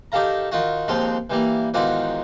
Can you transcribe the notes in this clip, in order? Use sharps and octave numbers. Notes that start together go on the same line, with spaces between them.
D#3 G4 A4 F5 A#5
D#3 F4 F#4
D#2 G#2 F3 C4 F5 C6
E3 G3 A#3
E2 G#2 D#3 F4 F#4 D6